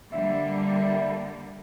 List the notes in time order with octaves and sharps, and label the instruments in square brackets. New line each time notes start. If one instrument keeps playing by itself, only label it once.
[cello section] D3 G3 A#3 [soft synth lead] E5